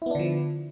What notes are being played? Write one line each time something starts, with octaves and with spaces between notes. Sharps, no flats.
D3 F3 B3 D4 E4